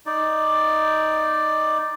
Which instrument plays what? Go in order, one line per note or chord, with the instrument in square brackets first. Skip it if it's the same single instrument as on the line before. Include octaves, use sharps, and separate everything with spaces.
[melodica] D#4 D5